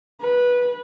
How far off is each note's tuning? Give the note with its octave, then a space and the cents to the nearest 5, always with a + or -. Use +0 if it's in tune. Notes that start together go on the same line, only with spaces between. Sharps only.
B4 -15